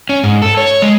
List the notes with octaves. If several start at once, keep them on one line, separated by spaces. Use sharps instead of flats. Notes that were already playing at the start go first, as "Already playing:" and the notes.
C#4
G#2
A4
C#5
G#3